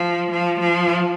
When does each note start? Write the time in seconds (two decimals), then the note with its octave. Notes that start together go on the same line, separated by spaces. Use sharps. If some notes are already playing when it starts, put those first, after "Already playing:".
Already playing: F3
0.31 F3
0.60 F3